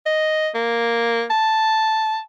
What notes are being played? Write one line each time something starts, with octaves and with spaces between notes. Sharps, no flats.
D#5
A#3
A5